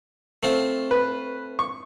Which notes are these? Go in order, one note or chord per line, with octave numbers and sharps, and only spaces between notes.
A3 C4 F4
B4
C#6